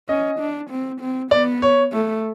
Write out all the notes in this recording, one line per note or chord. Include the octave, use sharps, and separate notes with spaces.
C#4 D#5
D4
C4
C4
B3 D5
C#5
A3